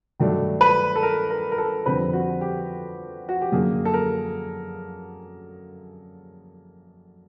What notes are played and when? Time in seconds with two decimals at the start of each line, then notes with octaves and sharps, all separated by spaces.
0.20 G2 D#3 F#3 A3 D4
0.61 B4
0.96 A4
1.03 A#4
1.30 A#4
1.52 A#4
1.58 A4
1.86 F2 D3 G3 C4 B4
2.13 F#4
2.41 G4
3.29 F#4
3.41 G4
3.52 F#2 D3 F#3 A#3 G#4
3.85 A4
3.94 A#4